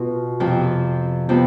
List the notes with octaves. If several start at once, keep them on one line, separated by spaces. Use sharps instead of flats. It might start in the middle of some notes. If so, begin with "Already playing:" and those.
Already playing: B2 F4
F2 C3 F3
C3 F3 B3